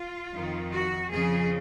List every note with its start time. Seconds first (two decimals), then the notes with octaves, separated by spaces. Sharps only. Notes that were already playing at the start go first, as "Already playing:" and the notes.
Already playing: F4
0.33 F2 D#3
0.72 F#4
1.10 F2 C#3 F3 G#4